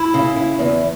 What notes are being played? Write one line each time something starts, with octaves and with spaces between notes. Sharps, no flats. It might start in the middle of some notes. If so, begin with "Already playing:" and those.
Already playing: E4
C#3
E4
E2